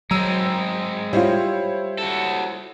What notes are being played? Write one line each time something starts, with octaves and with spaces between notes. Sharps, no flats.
F#3 G#3 C4 A#5 E6 D#7
G3 E4 F4 C5 C#5
F#4 A4